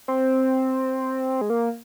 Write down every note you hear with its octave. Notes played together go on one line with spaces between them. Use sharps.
C4
G#3
A#3